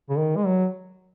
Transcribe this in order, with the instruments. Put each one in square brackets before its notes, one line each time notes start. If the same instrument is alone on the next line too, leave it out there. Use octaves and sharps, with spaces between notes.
[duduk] C#3
D#3
G#3
F#3